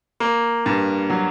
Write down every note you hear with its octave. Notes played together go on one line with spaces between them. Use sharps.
A#3
G2
F#3